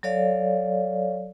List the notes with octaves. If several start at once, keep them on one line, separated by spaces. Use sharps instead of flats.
F#3 A4 C#5 D5 F5